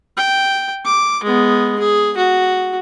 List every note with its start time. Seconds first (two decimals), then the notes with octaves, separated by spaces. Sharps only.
0.17 G5
0.86 D6
1.24 G#3 B3
1.80 G#4
2.17 F#4